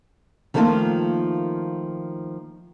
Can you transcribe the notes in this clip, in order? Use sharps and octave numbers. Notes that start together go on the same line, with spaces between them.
D#3 F3 A3 A#3 D#4 F4